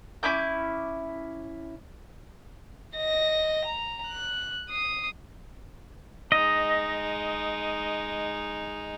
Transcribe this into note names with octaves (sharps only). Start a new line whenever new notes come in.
C#4 E4 D6 G6
D#5 A#6
A#5
F#6
D#6 C7
G#3 D#4 D#5